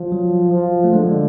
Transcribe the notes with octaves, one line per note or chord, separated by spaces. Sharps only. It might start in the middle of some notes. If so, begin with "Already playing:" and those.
Already playing: F3
F#3
F3
A3
D3 G#3